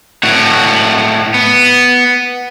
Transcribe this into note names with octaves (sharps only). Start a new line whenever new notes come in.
A2 F#4
B3